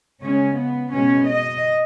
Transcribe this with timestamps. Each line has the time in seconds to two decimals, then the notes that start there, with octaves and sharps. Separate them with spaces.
0.22 C#3 G#3 C#4
0.57 B3
0.92 B2 G#3 C#4
1.27 D#5